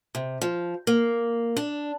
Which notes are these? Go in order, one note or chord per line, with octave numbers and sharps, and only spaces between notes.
C3
F3
A#3
D4